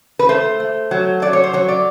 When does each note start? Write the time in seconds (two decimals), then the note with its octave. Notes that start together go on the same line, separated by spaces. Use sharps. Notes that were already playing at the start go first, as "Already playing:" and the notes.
0.19 B4
0.29 A3 C5
0.60 A3
0.91 F#3
1.22 F#3 D5
1.33 C#5
1.43 C5
1.53 F#3 C#5
1.68 D5